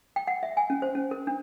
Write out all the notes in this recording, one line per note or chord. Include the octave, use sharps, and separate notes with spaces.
G5
F#5
E5
G#5
C#4
C5
C#4
A#4
D4